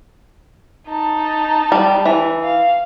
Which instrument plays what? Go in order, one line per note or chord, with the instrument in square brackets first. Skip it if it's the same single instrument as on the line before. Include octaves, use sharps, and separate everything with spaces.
[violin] D#4 A5
[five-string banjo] G3
E3
[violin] F5